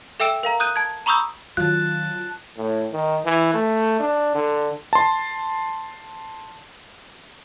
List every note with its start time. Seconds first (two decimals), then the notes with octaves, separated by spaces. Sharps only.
0.20 A4 E5 G5 E6 D7 E7
0.43 A#4 F5 A#5
0.60 D#6 F#6 G6 D#7
0.76 A5 G#6
1.06 A#5 B5 C#6 D#6 E6 G6
1.57 D#3 F#3 F4 A5 F#6
2.57 A2
2.92 D#3
3.25 E3
3.54 A3
4.00 D4
4.35 D3
4.93 A5 C6